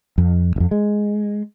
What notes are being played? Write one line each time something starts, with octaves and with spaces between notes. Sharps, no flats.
F2
D#1 F2
G#3